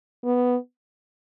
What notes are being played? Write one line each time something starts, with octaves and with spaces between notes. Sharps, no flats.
B3